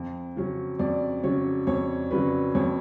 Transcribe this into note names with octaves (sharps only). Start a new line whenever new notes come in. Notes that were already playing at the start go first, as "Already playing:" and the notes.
Already playing: F2
C#3 F#3 C#4
F2 D5
C#3 F#3 C#4 C#5
F2 C#5
C#3 F#3 C#4 B4
F2 C#5